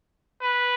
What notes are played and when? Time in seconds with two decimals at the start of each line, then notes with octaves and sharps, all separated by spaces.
0.42 B4